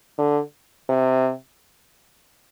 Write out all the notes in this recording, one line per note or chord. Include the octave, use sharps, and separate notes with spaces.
D3
C3